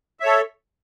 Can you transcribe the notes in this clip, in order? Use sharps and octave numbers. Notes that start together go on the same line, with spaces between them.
A4 C#5 E5